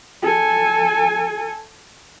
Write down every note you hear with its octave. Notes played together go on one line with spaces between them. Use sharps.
A4 G#5